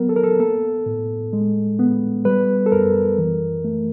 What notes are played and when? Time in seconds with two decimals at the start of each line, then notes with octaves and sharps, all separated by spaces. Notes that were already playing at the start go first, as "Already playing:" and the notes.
Already playing: F#3 B3 A#4
0.09 A4
0.16 A#4
0.24 A4
0.40 A#3 A4
0.86 A2
1.33 G#3
1.79 B3
2.25 G3 B4
2.66 A4
2.72 F#2 A#4
3.18 E3
3.64 A3